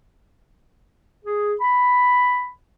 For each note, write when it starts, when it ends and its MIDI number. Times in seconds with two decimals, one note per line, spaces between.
1.25 1.54 68
1.60 2.48 83